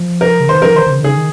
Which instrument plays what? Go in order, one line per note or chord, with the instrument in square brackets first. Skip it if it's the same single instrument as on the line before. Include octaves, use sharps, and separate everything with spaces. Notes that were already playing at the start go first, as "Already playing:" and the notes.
Already playing: [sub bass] F3
[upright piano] A#4
[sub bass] C#3
[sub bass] D#3 [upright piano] C5
[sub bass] F3 [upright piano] A#4
[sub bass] D#3 [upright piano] C5
[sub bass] D#3
C#3
D#3
[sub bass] C#3 [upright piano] G#4
[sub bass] D#3